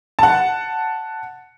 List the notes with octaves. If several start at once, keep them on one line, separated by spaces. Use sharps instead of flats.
F#5 A5